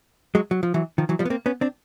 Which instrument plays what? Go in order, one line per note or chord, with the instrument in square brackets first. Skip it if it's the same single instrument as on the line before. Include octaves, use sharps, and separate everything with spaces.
[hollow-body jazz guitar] F#3 G#3
F#3
F3
E3 F#3
D#3 F3
E3 F#3
F3 G3
B3
A#3 C4
B3 C#4
C4 D4